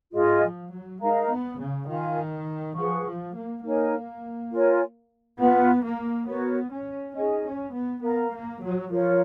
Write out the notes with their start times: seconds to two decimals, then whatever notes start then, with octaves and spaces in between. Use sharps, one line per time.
0.12 G#2 F4 G#4 D#5 G#5
0.42 F3
0.71 F#3
1.00 G#3 D#4 A#4 F5 A#5
1.29 B3
1.58 C#3
1.88 D#3 F4 A#4 F5 G#5
2.76 F3 G#4 B4 F#5 C#6
3.05 F3
3.34 A#3
3.63 A#3 D#4 A#4 C#5 G#5
4.51 F4 A#4 C#5 G#5
5.39 B3 F4 B4 F#5
5.83 A#3
6.27 B3 F#4 A#4 C#5
6.71 C#4
7.15 C#4 D#4 G#4 D#5 G#5
7.44 C#4
7.73 B3
8.02 B3 A#4 F5 A#5
8.32 A#3
8.60 F#3
8.90 F3 F4 A#4 C#5